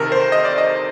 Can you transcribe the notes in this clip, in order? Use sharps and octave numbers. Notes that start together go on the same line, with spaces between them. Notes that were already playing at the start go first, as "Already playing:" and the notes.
Already playing: C2 C3 D#3 A4 A#4
C5
D#5
D5
D#5